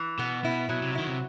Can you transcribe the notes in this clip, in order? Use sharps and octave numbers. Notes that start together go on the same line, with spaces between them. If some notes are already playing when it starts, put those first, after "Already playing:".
Already playing: E3
B2 B3
B2 E4
B2 F#3
C3
D#3 E4
C3